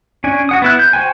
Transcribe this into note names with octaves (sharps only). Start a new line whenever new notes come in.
C#4 D4 G#5
F#4 F#5 D#6
B3 E4 F#6
G6
F#4 C5 G5 G#5